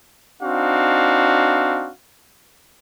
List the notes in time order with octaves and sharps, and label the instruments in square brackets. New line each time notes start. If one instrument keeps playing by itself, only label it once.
[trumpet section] C4 D4 D#4 F#4 F5